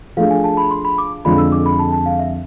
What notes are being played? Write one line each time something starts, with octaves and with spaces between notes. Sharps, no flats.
F3 A3 D4 G#4 F5
G#5
A5
B5
C6
B5
D6
F2 D3 G#3 D4 F4 B5
E6
D6
B5
A5
A5
F5
E5